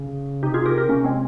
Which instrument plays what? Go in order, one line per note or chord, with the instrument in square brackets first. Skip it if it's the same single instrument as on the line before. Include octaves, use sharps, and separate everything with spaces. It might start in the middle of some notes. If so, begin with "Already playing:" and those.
Already playing: [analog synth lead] C#3
[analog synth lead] C3 [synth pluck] D#4 G4
[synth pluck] F4 G#4
G4 A#4
G4 A#4
[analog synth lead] C#3
[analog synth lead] C3 [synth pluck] A#3 C#4
[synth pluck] G#3 C4